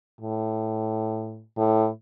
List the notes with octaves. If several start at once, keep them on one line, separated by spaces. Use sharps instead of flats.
A2
A2